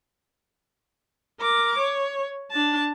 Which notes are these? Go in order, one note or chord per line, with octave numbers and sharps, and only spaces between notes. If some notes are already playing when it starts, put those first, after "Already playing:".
A#4 D6
C#5
D4 A5